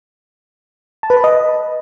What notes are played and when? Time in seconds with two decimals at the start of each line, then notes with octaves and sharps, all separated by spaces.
1.03 A5
1.10 B4
1.17 B5
1.24 D#5